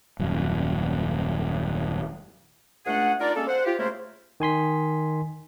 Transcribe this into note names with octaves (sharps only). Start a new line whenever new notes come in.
D#1 F#2
C#2 A3 D4 G#4 F#5
D4 D#4 F4 A#4 D5
G#3 A#3 C#4 A4
C5 F#5
F4 G4
C#3 A3 A#3 E4 A#4 C5
D#3 G#5 C6 B6